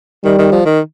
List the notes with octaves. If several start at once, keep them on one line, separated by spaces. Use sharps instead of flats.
D#3 G3
D#3
F3
D#3